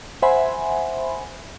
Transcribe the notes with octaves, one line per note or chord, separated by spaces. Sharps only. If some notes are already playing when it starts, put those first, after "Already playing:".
C5 E5 F#5 G#5 B5 C6